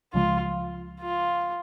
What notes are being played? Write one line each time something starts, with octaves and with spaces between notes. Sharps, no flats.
C#2 C#3 F3 G#3 F4
F4